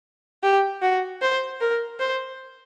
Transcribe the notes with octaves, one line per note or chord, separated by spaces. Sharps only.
G4
F#4
C5
A#4
C5